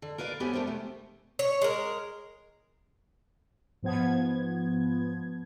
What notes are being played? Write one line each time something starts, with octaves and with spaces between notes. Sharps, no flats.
D3
A#4 B4 D5 F5
A3 B3 G4 C5 C#5 G#5
A3 D4 A#4 C5
C3 A3
C#5
G#3 A#4
G#2 F3 B3 G#6